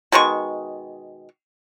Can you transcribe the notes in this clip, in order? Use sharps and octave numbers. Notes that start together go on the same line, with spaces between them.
B2 D#3 G#3 C#6